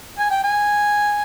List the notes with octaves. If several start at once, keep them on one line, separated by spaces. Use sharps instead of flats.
G#5
G5
G#5